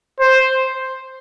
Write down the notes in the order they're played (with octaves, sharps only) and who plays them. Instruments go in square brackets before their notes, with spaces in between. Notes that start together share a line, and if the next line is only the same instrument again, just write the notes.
[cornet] C5